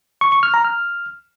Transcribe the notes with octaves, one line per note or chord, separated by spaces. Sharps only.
C#6
C#6
F6
A#5
F6